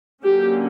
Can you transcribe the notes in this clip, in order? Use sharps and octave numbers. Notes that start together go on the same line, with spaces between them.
D3 F#3 A#3 C#4 G4